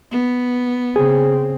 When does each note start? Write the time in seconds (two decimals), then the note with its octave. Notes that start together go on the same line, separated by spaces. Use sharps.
0.11 B3
0.96 C#3 C4 G#4